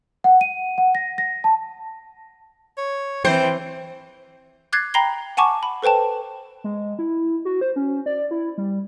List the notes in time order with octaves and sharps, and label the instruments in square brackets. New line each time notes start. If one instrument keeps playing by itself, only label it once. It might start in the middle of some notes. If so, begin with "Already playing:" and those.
[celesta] F#5
D#7
F#5
A#6
A#6
A5
[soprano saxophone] C#5
[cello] E3 C4 [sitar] C5 [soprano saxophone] G5
[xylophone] D6 F#6 G#6 A6 C7
G5 A#5 B5 A#6 C7 G7
F#5 G#5 A5 C#6 D6
B5
A4 B4 C5 G5 A5
[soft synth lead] G#3
E4
F#4
C5
C#4
D5
E4
G3